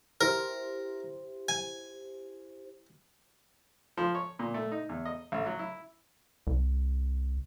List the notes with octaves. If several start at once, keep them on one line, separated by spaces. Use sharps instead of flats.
E4 G4 A#4 C5
G#5
F3
C#5
A#2
A3
D#4
E2
D#5
A1
F#3
E4
C2